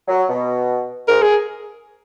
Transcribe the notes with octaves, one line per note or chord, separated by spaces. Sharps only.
F#3
B2
G#2 A#4
G#4